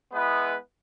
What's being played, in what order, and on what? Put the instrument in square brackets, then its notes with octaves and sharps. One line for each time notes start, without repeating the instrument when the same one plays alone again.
[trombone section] G#3 B3 E4 B4